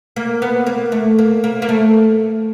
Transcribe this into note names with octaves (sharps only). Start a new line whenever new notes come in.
A#3
B3
A#3
A3
A#3
A#3
A#3
A3